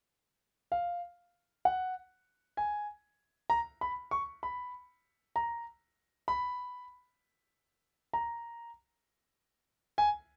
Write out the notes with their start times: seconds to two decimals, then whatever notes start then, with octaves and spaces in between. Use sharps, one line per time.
0.72 F5
1.65 F#5
2.57 G#5
3.50 A#5
3.81 B5
4.11 C#6
4.43 B5
5.36 A#5
6.28 B5
8.13 A#5
9.98 G#5